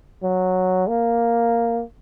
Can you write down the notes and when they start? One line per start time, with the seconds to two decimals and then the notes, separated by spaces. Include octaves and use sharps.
0.23 F#3
0.88 A#3